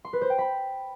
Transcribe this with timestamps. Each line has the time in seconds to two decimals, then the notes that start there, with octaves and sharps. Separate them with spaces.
0.05 C6
0.13 B4
0.21 C5
0.30 G5
0.38 B5